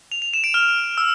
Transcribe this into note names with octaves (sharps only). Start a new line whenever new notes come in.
F7
F7
E7
D7
F6
E6